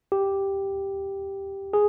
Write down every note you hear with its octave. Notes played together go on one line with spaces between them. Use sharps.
G4
G#4